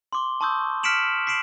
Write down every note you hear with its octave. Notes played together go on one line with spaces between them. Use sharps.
C6 D6 G7
A5 C6 C#6 D#6 E6 G6
F6 B6 C#7 D7 E7 F#7
D6 B6 C7 D7 E7 F#7